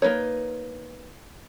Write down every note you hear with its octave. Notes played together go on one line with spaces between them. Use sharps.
A#3 D#4 B4 C#5